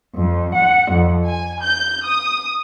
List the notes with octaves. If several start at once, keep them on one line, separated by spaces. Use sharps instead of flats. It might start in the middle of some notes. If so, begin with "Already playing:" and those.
F2
F#5
F2
G#5
G6
D#6